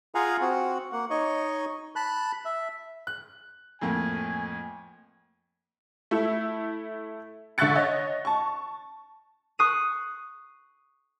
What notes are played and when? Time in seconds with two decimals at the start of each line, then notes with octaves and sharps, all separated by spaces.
0.15 F4 G#4 F5 F#5 G#5 A#5
0.41 C4 F#4 F#5
0.92 A#3 F#5
1.10 D#4 C#5 D#5 C#6
1.96 A5 B5 F#6
2.45 E5
3.07 F#6
3.82 F2 A2 A#3 G#5
6.11 A3 E4 E5
7.58 D3 E5 C#6 F#6 A6 C#7
7.76 C#5 D#5
8.25 A5 C#6
9.59 C#6 D#6 F#6 C7 D#7